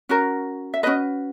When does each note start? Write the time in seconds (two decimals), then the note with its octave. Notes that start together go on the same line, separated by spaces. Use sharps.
0.09 C#4 F#4 A#4
0.74 E5
0.83 C#4 F#4 B4 D#5